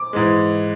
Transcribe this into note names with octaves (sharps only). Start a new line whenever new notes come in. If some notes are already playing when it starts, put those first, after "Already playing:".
Already playing: D6
G#2 E3 G#3